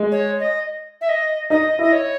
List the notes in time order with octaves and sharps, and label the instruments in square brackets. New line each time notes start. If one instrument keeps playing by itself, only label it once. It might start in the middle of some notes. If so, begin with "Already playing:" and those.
Already playing: [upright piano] G#3
[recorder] C#5
D#5
E5
D#5
[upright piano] D#4 [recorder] D#5
[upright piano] E4 [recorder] D#5
[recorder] C#5